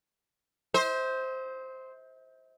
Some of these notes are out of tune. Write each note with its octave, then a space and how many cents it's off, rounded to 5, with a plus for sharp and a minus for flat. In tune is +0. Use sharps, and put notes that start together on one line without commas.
C5 +0 E5 -45